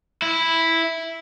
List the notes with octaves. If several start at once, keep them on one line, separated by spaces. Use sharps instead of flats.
E4